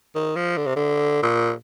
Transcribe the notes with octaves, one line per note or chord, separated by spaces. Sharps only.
D#3
F3
D3
C3
D3
A#2